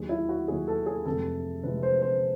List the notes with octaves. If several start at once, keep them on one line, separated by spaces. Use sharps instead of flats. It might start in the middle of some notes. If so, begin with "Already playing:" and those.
Already playing: D#2 D#3 F#3 G#4
E4
F#4
D#2 D#3 F#3 G#4
A4
G#4
F1 F2 C3 E3 G#3 A4
F1 F2 C3 E3 G#3 B4
C5
C5